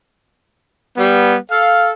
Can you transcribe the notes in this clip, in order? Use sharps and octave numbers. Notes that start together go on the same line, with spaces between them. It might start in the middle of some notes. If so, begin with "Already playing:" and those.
G3 B3
A4 F5